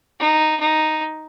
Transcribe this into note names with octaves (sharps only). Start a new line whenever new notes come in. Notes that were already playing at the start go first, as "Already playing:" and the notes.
D#4
D#4